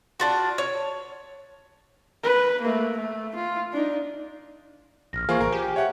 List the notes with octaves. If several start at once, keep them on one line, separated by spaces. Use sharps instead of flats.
D4 F4 F#4
C#5
B4
A3 A#3
A3
F4
D4 D#4
A#1 F6 A#6
E3 A#3 F4 G#4 C5 C#6
A1 A#4
G4 G#5
C#5 E5 F#5